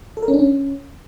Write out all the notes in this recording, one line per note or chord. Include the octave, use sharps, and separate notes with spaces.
A4
A#4
C#4
D4
C#4